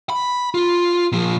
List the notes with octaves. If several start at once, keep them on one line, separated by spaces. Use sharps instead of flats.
B5
F4
A#2 F3